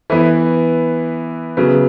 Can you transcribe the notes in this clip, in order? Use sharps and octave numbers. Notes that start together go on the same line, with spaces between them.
E3 B3 E4
C#3 F#3 B3